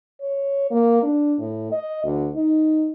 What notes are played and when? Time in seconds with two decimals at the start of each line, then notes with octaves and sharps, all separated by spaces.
0.21 C#5
0.71 A#3
1.03 D4
1.39 A2
1.72 D#5
2.04 D2
2.36 D#4